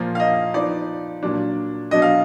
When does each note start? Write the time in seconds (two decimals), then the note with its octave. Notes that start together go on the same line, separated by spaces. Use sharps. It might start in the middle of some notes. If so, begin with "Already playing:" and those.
Already playing: A#2 F3 A#3
0.15 F5
0.20 D#5
0.54 F3 B3 D#4 D5
1.23 A#2 F#3 D4
1.91 B2 F#3 D4 D#5
2.02 F5